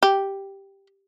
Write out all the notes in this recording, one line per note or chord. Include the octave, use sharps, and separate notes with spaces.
G4